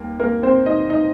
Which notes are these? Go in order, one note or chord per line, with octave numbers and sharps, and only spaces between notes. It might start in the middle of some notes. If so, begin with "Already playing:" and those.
Already playing: D#2 G3 A#3 A#4
A#3 A#4
C4 C5
D#4 D#5
D#4 D#5